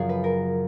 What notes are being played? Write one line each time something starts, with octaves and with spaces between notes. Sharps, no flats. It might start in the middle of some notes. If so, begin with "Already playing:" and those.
Already playing: F#2 C#3 F3 G#4
B4
A#4